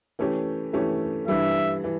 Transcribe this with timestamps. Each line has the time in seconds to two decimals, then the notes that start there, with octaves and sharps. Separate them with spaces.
0.19 E3 A3 C#4 G4
0.73 E3 A3 C#4 G4
1.28 G2 E3 G3 E5
1.84 E3